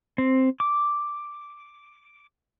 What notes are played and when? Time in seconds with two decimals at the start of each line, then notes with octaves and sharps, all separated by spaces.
0.18 C4
0.60 D6